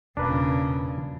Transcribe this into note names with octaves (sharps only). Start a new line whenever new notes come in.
E1 A#2 C#3 D4 A#4 B4